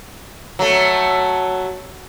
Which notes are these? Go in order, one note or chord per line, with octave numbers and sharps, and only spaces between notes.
F#3 A3